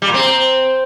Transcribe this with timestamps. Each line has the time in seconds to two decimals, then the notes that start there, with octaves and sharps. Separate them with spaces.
0.02 G3
0.08 A#2
0.14 C4